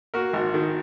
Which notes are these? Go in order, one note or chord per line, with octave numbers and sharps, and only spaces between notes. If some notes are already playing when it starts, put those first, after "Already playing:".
A#3 F#4 A#4
G#1
D#3